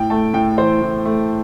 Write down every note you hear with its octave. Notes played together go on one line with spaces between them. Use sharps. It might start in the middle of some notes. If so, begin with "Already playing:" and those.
Already playing: A2 G5
A3 A5
A2 G5
E3 C5
A2
A3